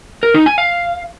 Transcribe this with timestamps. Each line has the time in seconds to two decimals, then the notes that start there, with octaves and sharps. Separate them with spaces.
0.23 A#4
0.34 D#4
0.46 G#5
0.58 F5